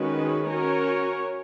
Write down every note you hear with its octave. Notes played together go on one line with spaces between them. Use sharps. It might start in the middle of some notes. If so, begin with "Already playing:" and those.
Already playing: D#3 G#3 C#4 F#4 B4
C#4 F#4 A#4 C#5